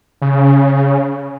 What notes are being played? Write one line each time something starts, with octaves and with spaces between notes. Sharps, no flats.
C#3